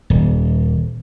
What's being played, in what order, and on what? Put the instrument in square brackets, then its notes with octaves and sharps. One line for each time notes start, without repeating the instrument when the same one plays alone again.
[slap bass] D#1